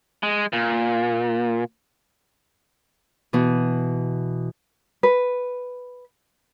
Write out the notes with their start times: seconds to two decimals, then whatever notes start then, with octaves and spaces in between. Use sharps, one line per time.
0.23 G#3
0.53 A#2
3.33 B2 E3
5.03 B4